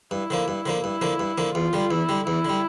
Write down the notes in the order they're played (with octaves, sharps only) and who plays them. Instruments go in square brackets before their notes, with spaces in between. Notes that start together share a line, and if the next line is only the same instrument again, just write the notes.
[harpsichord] G2 [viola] E4
[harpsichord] D3 F3 A#3
G2
D3 F3 A#3
[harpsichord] G2 [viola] E4
[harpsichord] D3 F3 A#3
G2
D3 F3 A#3
[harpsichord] E2 [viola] F4
[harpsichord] D3 G3
[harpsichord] E2 [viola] E4
[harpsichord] D3 G3
[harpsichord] E2 [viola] E4
[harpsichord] D3 G3